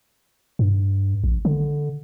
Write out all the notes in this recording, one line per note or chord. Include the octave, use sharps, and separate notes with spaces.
G2
A#1
D3